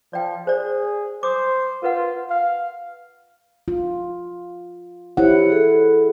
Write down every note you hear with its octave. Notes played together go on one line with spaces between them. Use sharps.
F3 D5 G5
G#4 C5 D5
C5 D6 D#6
F4 A#4 B4 F#5
F5
F4
E4 G4 C5 C#5 F#5
G#4 A4